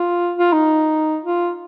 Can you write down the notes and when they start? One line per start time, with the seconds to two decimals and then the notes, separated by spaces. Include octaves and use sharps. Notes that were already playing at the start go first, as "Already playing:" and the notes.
Already playing: F4
0.38 F4
0.52 D#4
1.25 F4